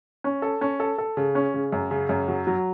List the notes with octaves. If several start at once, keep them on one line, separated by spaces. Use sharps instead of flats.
C#4
A4
C#4
A4
A4
C#3
C#4
C#3
F#2
C#3
F#2
F#3
F#3